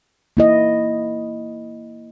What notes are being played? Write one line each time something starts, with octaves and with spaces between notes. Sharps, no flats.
A#3 E4 D#5